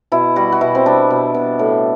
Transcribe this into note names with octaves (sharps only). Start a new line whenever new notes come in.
B2 E4
G3 F#4
F#4
B2 E4
C4
G3 D4
B2
B2
A2